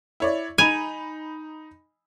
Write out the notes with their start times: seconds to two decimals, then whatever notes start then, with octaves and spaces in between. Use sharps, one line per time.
0.20 E4 C#5 D5
0.58 D#4 G#5 B5 F7